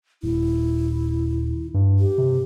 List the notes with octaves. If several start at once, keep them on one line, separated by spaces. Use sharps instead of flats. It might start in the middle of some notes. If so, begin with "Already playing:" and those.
D#1 E4
G2
G4
C3